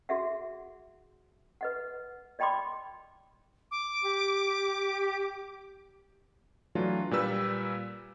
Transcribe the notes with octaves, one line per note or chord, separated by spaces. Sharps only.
F#4 G#4 E5 F#5
B4 D#5 F#5
D5 D#5 G5 B5 C6 D6
D6
G4
E3 F#3 A3 D4 F4
A#2 G3 B4 E6